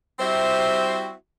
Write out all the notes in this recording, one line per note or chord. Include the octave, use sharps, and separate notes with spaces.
G3 C4 E4 F#4 C5 E5